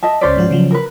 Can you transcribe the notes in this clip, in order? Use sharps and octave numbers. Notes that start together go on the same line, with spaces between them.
D#5 E5 A5
C#2 C#4 C5 D5 A6 B6
G#2 F3 F#4
C#3 F3 F#3
A#4 B4